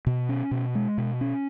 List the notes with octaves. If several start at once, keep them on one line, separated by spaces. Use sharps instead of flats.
B2
C#4
B2
G#3
B2
C#4